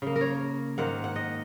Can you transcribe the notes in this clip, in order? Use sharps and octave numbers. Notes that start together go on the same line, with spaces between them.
C#3 A#3
A#4
C#5
G#2 D#3 A#3 F#5
F#5
D#5